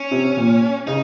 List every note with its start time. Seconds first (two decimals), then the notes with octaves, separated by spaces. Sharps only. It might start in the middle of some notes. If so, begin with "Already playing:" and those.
Already playing: C#4
0.11 C3
0.37 A#2
0.87 C#3 D#4